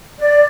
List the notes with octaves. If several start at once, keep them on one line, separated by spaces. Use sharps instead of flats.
D5